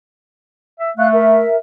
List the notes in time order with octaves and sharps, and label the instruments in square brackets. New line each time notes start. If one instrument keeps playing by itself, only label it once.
[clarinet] E5
[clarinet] A3 [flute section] F5 F#6
[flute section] A#4 E5